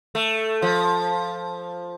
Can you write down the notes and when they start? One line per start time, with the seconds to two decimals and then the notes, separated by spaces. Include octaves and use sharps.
0.15 A3
0.62 F3